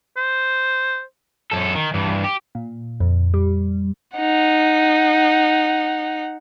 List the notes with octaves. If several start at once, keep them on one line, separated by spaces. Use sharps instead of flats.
C5
F#2 A4
D#3
G2 E3
G4
A#2
F2
G3
D#4 F#5